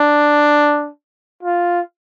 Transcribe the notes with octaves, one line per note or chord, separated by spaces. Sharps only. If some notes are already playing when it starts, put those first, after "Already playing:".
Already playing: D4
F4